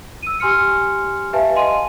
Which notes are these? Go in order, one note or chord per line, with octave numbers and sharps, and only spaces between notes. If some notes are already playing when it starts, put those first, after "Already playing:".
E6 D#7
G4 G#5 C6 F6 C#7
G4 B4 E5 F5 G#5 A5
D#5 F5 G#5 C6 D#7